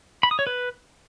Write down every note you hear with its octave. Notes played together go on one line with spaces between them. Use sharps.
B5
D#6
C#5
B4